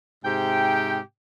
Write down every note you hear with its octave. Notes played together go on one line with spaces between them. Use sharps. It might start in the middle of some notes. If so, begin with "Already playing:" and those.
G#2 C3 G4 G5